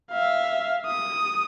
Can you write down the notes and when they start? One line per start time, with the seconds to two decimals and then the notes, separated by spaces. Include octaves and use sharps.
0.12 E5 F5
0.86 D#6